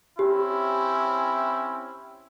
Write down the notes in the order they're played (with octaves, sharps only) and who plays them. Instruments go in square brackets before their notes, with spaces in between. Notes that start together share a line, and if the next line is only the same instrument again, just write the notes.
[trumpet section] C4 C#4 E4 [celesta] G4